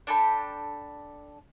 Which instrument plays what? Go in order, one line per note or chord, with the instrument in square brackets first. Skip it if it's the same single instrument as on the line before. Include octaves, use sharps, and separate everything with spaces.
[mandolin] D4 A4 G5 B5